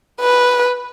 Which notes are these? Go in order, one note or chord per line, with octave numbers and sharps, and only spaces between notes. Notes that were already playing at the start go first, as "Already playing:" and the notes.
B4